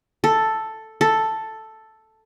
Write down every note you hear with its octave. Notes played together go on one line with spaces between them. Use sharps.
A4
A4